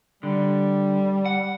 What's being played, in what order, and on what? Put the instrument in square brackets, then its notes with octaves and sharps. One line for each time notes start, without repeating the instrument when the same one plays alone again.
[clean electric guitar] D3 [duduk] G3
[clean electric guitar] F#5